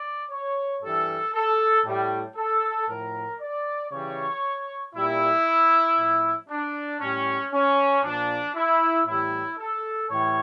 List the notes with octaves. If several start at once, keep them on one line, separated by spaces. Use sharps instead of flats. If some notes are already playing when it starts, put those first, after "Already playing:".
Already playing: D5
C#5
G2 E3 G3 A4
A4
A2 G3
A4
A2 F3 A#4
D5
C#3 E3 G3 C#5
A#2 G3 E4
A2 F3
D4
A2 G3 C#4
C#4
A#2 F3 D4
E4
A2 E3 G3 E4
A4
A2 E3 G3 C#5